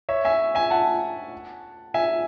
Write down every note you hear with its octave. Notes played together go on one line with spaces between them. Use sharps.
C#5 E5
E5 G#5
E5 G#5
F#5 A5
E5 G#5